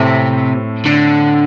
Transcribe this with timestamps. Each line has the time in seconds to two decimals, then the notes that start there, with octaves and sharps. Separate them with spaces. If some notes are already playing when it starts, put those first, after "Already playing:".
Already playing: A2 C3 A3 C4
0.86 D3